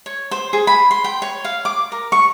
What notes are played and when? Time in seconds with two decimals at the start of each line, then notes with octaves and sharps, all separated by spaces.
0.06 C#5
0.31 C5
0.53 G#4
0.67 B5
0.91 C6
1.04 G5
1.22 C#5
1.45 F5
1.65 D6
1.92 A#4
2.12 C#6